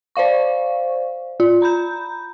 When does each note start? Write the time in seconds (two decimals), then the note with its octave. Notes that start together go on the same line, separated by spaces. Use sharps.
0.16 C5 D5 F5 C#6
1.40 F4
1.62 A#5 B5 G6